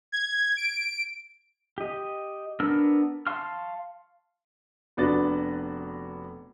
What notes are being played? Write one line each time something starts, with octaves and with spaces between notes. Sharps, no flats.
G#6
D7
G4 D#5
B3 D4 A#4 E6 F6
F5 A5 C6 C#6 F6
F1 B3 D4 F#4 A6